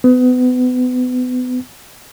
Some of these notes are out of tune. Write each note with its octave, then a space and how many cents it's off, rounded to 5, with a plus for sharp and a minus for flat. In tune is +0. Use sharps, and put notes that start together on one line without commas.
B3 +30